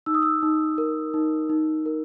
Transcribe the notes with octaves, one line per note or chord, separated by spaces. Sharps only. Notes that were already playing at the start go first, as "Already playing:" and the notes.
D#4 E6
D#6
E6
D#4
A#4
D#4
D#4
A#4